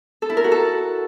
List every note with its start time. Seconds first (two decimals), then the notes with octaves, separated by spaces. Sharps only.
0.22 A4
0.29 E4
0.37 A#4
0.44 F#4
0.52 A4